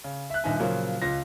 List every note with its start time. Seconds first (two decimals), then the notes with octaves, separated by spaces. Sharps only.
0.04 C#3
0.30 E5 F#6
0.44 D#1 G2 D#4 E5 G#5
0.60 A#2 C#3 F3 F#3 A#3
1.02 C#2 F4 A#6